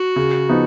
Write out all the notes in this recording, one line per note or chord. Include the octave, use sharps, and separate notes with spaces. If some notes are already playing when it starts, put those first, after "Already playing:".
Already playing: F#4
C#3
F3 B3 D#4